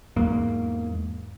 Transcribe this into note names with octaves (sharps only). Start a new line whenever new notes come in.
E2 G#2 A#3